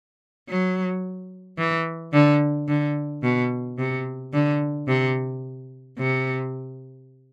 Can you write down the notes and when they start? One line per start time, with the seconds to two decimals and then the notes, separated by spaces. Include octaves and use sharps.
0.48 F#3
1.58 E3
2.13 D3
2.68 D3
3.23 B2
3.78 C3
4.33 D3
4.88 C3
5.98 C3